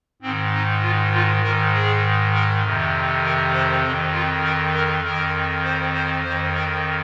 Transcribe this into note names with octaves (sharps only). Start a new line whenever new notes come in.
G#2 D#3 C4
D#4
F4
F4
G#2 D#3 A#4
G#4
A#4
F2 C3 D#3
A#4
C5
F2 D#3 C4
F4
A#4
A#4
F2 D#3 A#4
C5
C5
F2 D#3 C5
A#4